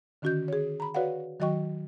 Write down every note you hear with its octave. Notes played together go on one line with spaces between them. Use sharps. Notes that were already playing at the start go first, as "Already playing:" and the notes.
D3 D#3 C#4 F#4 D#5 G6
G#4 C#5
A#5 B5
F#4 B4 C#5 D5 F5 F#5
D#3 F#3 F#4 D#5 G5 C#6